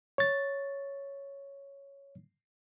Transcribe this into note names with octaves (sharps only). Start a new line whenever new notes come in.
C#5 A6